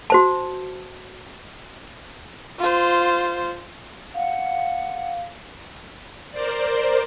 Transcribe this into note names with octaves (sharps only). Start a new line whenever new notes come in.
F#4 C5 A5
F4 C5
F5 F#5
A#4 C5 D5